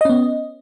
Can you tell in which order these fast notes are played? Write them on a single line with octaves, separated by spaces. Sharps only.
D#5 C#4 B3